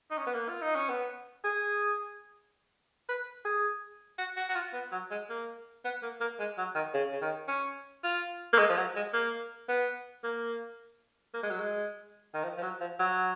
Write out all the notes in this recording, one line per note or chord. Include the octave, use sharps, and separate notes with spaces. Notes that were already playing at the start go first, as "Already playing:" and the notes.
D#4
C#4
B3
A#3
F4
D#4
C#4
B3
G#4
B4
G#4
F#4
F#4
F#4
F4
B3
F#3
G#3
A#3
B3
A#3
A#3
G#3
F#3
D#3
C#3
C#3
D#3
C#4
F4
A#3
G#3
F3
F#3
G#3
A#3
B3
A#3
A#3
G#3
F#3
G#3
D#3
F3
F3
F#3
F3
F#3